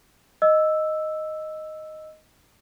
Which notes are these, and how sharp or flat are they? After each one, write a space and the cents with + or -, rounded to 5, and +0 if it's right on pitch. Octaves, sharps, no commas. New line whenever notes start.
D#5 +0 E6 +0